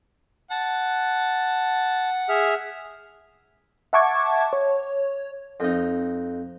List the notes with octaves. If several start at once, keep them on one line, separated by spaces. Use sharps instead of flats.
F#5 A5
G#4 E5 F6
E5 F#5 A5 C#6 D6 G#6
C#5
F2 D#4